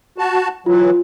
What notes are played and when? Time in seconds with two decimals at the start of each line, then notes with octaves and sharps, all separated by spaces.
0.18 F#4 A5
0.66 E3 F#3 F4